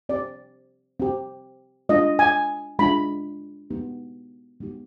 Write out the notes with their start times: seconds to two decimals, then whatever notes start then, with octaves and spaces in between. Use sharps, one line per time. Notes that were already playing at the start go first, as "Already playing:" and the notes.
0.09 C4 G4 D5
1.00 C4 G4
1.89 G#3 D4 F4 D#5
2.19 G#5
2.79 G#3 D4 F4 B5
3.70 G#3 B3 D#4 G4
4.60 G#3 B3 D#4 G4